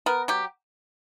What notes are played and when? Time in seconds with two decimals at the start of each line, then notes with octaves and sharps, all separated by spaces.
0.06 B3 A#4
0.28 F#3 G4